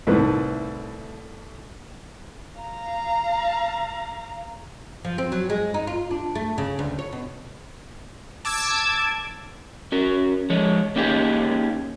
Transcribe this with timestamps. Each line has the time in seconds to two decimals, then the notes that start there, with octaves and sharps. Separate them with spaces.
0.07 C2 A2 D#3 A3 C4 B4
2.60 F5 A#5
5.05 F3
5.18 C4
5.32 F#3
5.50 G#3
5.74 D#4
5.87 F4
6.11 D4
6.35 A3
6.58 C#3
6.79 D2
6.99 C#5
7.13 B2
8.45 A5 D6 E6 G#6
9.92 C#4 F#4 A#4
10.50 F3 G#3 C#5
10.96 A#3 C#4 D#4 F4 G4 G#4